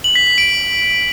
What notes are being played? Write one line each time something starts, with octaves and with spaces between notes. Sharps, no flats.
F#7
B6
B6
D7